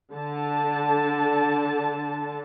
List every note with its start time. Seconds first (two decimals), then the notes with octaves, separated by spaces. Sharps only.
0.13 D3 A5